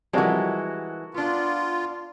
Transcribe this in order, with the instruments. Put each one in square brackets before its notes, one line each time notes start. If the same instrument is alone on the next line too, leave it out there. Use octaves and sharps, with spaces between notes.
[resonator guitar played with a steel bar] E3 G#3 [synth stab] F3 G3 C4 [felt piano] F#4 A#4 A5
[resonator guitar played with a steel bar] B3 D4 [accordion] F4